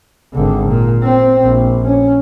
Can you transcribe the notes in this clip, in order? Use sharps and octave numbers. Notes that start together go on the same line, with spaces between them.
G#1 D3
A#2
C4
A#1
C#4